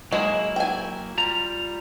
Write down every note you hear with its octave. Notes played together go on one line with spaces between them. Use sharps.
F#3 G#3 A#3 E4
G5 G#5
G3 F4 A#5